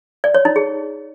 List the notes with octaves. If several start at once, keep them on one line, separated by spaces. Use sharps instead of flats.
D5
C#5
D#4
G#4